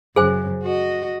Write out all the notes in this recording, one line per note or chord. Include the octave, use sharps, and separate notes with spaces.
F#2 C#3 G#4 C5 G#5
F#4 D#5